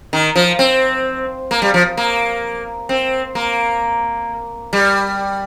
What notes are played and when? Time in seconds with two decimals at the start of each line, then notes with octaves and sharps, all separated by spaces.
0.13 D#3
0.36 F3
0.59 C4
1.51 A#3
1.62 G3
1.74 F3
1.97 A#3
2.89 C4
3.35 A#3
4.73 G3